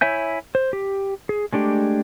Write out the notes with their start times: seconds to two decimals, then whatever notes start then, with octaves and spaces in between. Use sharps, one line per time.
0.01 E4 C#5 E5 G#5 G6
0.55 C5
0.73 G4
1.29 G#4
1.53 G#3 A3 D4 G4